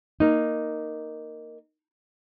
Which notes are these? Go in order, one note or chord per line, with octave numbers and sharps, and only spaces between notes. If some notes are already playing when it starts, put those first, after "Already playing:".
A#3 D#4